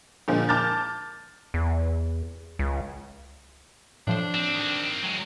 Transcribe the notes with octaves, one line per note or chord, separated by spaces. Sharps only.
A#2 D3 F3 G#3
A5 D6 F6 G6 A6
E2
C#2
A2 F3 D4 C5
C4
D#3 C4
F#3 G#3